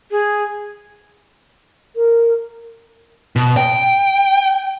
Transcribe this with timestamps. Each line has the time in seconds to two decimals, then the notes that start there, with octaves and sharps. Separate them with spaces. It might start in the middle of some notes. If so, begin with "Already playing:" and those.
0.11 G#4
1.96 A#4
3.36 B2
3.57 G5